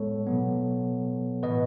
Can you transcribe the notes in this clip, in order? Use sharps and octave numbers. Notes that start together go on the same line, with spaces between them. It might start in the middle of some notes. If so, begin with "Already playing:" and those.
Already playing: A2 G#3 B3 A4 C#5
B2 F#3 B3
A2 E3 B3 B4 D#5